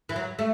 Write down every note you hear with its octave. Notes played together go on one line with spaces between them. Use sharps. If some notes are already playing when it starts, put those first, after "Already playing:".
E3
F#3
A3